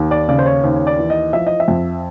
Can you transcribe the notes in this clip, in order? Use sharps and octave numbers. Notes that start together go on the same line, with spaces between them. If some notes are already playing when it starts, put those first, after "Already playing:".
Already playing: D#2
D5
C#3 D5
C5
C#5
D#2 C5
C#5
D5
E3
D#5
F3 E5
D#5
E5
F2